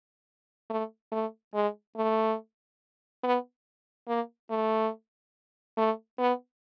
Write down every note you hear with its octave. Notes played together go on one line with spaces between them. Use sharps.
A3
A3
G#3
A3
B3
A#3
A3
A3
B3